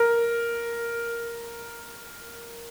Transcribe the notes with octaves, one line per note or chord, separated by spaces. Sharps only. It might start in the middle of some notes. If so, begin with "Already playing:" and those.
Already playing: A#4